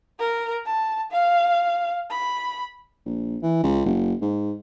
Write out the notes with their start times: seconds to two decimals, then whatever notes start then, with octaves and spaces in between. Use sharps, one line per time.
0.19 A#4
0.66 A5
1.12 F5
2.10 B5
3.06 A#1
3.43 E3
3.63 C#2
3.86 F#1
4.22 G#2